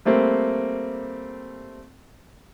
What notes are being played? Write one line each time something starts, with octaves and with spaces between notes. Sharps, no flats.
G3 A3 A#3 C4